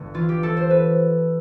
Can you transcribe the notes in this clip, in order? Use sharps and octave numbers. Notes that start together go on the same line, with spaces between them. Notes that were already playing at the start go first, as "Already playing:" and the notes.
Already playing: G1 A3
E3 F4
G4
A3 A4
C5
B4